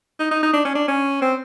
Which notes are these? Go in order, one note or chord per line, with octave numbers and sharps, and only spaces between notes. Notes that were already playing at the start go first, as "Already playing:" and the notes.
D#4
D#4
D#4
D4
C#4
D4
C#4
C4